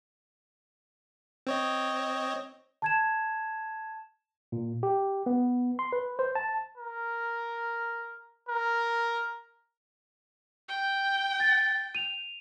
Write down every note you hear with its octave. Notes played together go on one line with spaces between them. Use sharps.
C4 C#5 D#5
A5 G#6 E7
A#2
G4
B3
C6
B4
C5
A5
A#4
A#4
G5
A6
D#7 F7